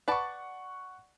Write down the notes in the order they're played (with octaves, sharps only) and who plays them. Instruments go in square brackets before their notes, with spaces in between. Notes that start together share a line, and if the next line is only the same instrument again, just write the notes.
[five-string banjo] B4 D5 A5 [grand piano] F#5 C#6